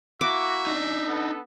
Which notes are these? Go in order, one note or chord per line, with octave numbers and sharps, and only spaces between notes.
A#3 E4 F#4 E5 D6
D4 D#4
B3 A4